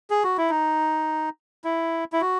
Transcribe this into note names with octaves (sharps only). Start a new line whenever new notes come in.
G#4
F#4
E4
D#4
E4
E4
F#4